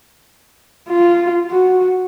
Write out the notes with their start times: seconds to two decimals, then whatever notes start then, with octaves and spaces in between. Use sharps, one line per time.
0.89 F4
1.51 F#4